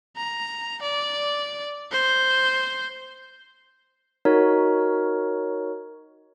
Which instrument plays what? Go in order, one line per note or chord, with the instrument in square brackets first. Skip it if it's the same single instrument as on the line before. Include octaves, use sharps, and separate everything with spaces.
[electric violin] A#5
D5
C5
[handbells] D#4 F#4 A#4 C#5